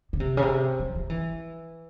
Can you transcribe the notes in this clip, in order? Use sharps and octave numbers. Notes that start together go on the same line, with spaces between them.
C#3
C3
C#3
C3
F3
F3
E3